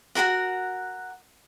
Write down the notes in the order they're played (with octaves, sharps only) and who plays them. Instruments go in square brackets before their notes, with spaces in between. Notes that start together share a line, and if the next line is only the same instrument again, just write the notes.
[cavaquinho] F#4 G#4 A#4 F#5